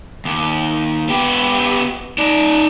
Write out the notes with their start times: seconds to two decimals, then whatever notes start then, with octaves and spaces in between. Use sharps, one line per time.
0.25 D#2
1.09 B3 G4
2.18 D#4 D5